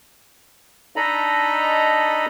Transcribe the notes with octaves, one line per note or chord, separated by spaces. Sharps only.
D4 D#4 A4 D#5 A#5 B5